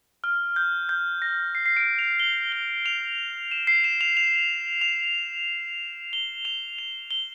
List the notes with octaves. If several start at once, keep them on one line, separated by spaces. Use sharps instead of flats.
F6
G6
G6
A#6
C7
C7
D7
F7
G7
G7
F7
E7
C7
E7
F7
F7
F7
G7
F7
F7
G7